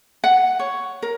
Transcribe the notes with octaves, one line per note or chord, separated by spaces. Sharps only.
F#5
C#5
A#4